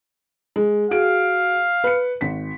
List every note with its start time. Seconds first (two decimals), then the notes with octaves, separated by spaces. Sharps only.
0.56 G#3
0.91 F#4 G#4 F5 D7
1.84 B4 C#7
2.21 G#1 B6